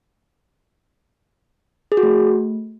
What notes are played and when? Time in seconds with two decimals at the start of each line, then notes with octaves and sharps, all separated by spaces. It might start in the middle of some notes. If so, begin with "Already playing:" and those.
1.92 G#4
1.97 F#4
2.03 A3